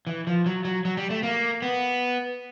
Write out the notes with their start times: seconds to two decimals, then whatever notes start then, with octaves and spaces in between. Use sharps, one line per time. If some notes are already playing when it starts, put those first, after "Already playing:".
0.07 E3
0.27 F3
0.46 F#3
0.65 F#3
0.85 F#3
0.97 G3
1.10 A3
1.23 A#3
1.62 B3